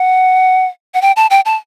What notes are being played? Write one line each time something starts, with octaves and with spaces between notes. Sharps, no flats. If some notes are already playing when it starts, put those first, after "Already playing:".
Already playing: F#5
F#5
G5
A5
G5
A5